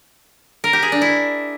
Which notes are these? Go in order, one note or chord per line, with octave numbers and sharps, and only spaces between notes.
A#4
G4
G#4
D4
E4